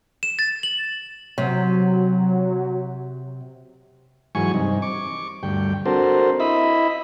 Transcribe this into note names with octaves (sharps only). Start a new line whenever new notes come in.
E7
A6
F#7
C3 F#3
G#2 E3 F#3 G#5 C#6
G2 C3 D#4
C#6 D6
D2 G2 G5
C4 D4 F#4 A4 A#4 C5
E4 D#5 E5 B5